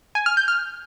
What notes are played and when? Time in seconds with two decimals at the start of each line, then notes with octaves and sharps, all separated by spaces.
0.15 G#5
0.26 F6
0.37 G6
0.48 F6